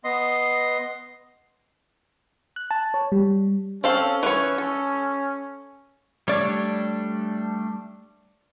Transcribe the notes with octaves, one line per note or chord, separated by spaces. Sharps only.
B3 D#5 C6
F#6
A5
C#5
G3
C4 C#4 A4 F5
E3 C#5
A4
G3 A3 D4 C#5 D5